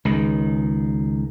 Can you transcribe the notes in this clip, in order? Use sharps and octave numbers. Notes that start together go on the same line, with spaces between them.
C#2 D#3